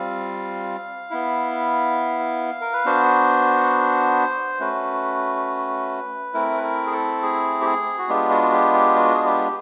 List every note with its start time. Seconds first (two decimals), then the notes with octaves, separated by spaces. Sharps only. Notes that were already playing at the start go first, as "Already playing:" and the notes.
Already playing: G3 C4 F4 F5
1.11 B3 E4
2.61 A#4
2.73 B4
2.85 B3 D4 F#4 C5
4.60 A3 C#4 F#4 B4
6.34 A3 C4 E4 A#4
6.57 B4
6.64 A#4
6.86 G#4
6.92 A4
7.22 G#4
7.61 G4
7.65 G#4
7.98 F#4
8.09 G#3 B3 D4 F4 G4
8.31 F#4
8.42 F#4
8.52 G4
8.74 G4
8.96 F#4
9.15 G#4
9.25 G4